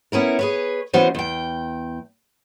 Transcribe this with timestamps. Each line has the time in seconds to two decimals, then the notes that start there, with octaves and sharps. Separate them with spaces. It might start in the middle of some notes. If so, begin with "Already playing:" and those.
0.12 B3 C#4 E4 A#4
0.39 G#4 B4 C#5
0.93 E3 B3 C#4 F#4 C5 D5
1.15 E2 G5